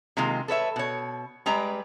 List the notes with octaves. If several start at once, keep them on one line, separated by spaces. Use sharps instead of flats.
C3 D#3 G#3 A#3 F4
A4 B4 C#5 E5
B2 C#5
G3 G#3 B4 D5 A#5